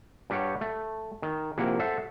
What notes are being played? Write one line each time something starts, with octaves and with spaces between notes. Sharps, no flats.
G2 G3 G4 C#5 F#5
A3
D#3
A#1 C3 A#3 E4 F#5
A4 C5 E5 F#5